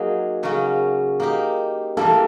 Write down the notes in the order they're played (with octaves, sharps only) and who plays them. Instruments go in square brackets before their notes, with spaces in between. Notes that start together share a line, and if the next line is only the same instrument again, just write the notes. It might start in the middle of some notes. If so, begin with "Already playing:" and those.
Already playing: [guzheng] F#3 A#3 D#4 G#4
C#3 F#3 A#3 C#4
A#3 D#4 G4
[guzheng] E3 G3 A#3 [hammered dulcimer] A4